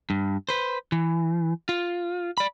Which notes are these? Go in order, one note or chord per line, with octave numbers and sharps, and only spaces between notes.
G2
B4 C5
E3
F4
D5 B5